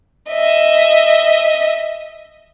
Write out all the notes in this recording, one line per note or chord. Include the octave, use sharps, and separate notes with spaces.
D#5 E5